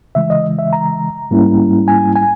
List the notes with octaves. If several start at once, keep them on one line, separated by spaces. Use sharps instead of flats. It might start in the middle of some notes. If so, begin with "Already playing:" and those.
C#3 E3 G#3 E5
D#5
E5
A#5
G#2 G3 A#3 C#4 E4
G#5
G#5